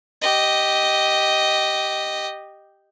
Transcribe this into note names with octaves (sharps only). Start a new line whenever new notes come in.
G4 D#5